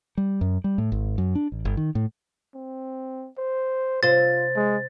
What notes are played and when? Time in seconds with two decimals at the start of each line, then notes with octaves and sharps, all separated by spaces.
0.17 G3
0.41 F#2
0.64 G3
0.78 A2
0.92 G#1
1.18 F#2
1.35 D4
1.52 A1
1.65 G1
1.77 D#3
1.95 A2
2.55 C4
3.38 C5
4.03 C3 F4 C5 A6
4.56 G#3